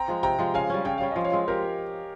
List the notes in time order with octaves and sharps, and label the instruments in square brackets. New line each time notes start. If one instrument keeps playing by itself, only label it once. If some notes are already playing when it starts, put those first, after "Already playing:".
Already playing: [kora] C4 [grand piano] G5 A#5
[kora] F3 G#3
[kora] C3 [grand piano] G5 A#5
[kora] F3 G#3
[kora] C#3 [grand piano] F5 G#5
[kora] G3 C#4
[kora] C#3 [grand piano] G5
[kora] G3 C#4 [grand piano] F5
[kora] F3 [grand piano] D#5
[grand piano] C#5 F5
[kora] G#3 C4 F4
[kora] F3 [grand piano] G4 A#4